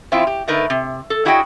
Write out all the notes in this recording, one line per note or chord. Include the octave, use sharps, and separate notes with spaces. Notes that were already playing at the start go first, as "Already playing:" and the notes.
E2 C4 E4 F4
G4
D3 A3 D#4 A#4 B4
C3
A4
D4 E4 F#4 G#4 D#5 G5